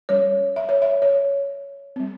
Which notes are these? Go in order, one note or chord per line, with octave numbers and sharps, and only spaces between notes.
G3 C#4 C#5
E5
C#5
E5
C#5
G3 C4